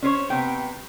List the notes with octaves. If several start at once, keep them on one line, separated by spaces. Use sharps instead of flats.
C#4 C5 C#5
C3 B3 G5